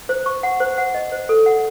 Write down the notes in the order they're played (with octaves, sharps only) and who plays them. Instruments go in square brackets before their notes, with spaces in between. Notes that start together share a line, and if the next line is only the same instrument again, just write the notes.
[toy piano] C5
C#6
F#5
C5
F#5
D#5
C5
A4
F#5